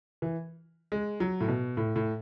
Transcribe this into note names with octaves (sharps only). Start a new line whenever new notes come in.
E3
G#3
F#3
A2
B2
A2
A2